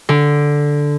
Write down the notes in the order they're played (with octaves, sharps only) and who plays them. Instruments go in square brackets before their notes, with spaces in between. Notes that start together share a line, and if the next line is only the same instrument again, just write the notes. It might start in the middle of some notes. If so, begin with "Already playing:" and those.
[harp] D3